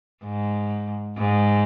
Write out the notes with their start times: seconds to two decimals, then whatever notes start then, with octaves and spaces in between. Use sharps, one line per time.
0.25 G#2
1.18 G#2